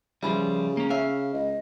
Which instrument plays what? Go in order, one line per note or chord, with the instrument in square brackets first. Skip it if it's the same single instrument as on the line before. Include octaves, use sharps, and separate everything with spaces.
[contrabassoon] C#3 [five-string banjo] E3 B4 G#5 [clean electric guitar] F3 G3
[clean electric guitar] A#3 C#4
[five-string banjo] C#4 E5 [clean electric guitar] F5
[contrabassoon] C#2 [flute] D#5